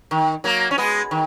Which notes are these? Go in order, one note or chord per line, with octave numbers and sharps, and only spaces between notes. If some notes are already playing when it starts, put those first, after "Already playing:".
D#3
F#3 A#3
C#4
G#3 B3
D#3